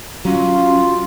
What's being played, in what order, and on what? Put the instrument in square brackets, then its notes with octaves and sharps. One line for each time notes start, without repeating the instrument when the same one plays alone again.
[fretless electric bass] F#3 [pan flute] C#4 [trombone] F4